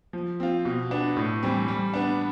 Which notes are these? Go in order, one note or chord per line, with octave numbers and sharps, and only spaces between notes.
F3
C4 F4
B2
B3 D4
A2
E3 G3 C4
G3
B3 D4